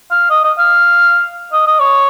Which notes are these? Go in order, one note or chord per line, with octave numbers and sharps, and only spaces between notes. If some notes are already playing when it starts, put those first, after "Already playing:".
F5
D#5
D#5
F5
D#5
D#5
C#5